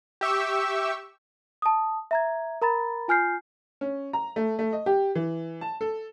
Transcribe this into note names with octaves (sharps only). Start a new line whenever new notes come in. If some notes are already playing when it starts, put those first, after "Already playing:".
G4 E5 C#6 E6
A5 D#6
E5 A#5 G#6
A#4 A#5 B5 A6
F4 G#5 F6 G6 C7
C#4
A#5
A3
A3
D#5
G4
E3
A5
A4